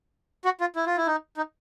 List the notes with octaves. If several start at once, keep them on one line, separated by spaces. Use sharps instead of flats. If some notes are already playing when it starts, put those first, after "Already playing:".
F#4
F4
E4
F4
E4
D#4
D#4